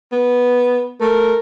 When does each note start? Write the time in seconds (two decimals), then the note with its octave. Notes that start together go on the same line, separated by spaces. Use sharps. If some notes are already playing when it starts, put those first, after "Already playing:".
0.12 B3
1.01 A3 A#4